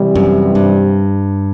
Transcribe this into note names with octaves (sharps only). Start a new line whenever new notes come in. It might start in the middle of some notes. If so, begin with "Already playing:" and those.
Already playing: C3 E3 G3
F#2
G2